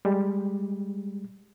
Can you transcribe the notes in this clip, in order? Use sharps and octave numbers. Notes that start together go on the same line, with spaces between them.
G3 G#3